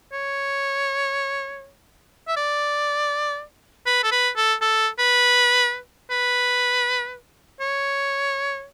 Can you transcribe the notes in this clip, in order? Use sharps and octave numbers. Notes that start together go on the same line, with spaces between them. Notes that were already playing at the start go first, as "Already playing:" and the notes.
C#5
E5
D5
B4
A4
B4
A4
A4
B4
B4
C#5